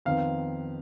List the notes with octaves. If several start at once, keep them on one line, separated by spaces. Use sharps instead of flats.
F2 D#3 B3 F5